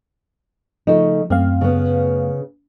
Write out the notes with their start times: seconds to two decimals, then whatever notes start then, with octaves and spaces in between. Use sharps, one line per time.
0.87 C#3 F3 A3 D#4
1.30 F#2 A3 C4 F5
1.61 C#3 B3